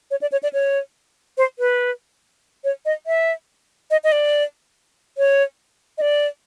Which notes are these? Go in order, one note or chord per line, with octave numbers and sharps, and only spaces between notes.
C#5
D5
C#5
D5
C#5
C5
B4
C#5
D#5
E5
D#5
D#5
D5
C#5
D#5
D5